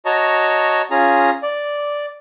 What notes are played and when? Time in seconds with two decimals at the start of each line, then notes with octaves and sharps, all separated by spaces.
0.05 F#4 C#5 D#5 A5 A#5 C#6
0.91 C#4 F4 G#4 A#5
1.43 D5